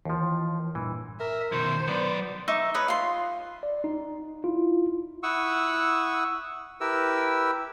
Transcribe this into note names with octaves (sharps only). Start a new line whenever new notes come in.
D#2 E3 F3
G2 A#2 E3
A#4 E5
B2 D#3 C5
F#3 B3 D5
D#4 E5 C#6 D6
B4 C#5 D#6
F4 C6
D5
D#4
E4 F4
E4 F#5 C#6 D#6 E6
E4 G4 A#4 B4 E6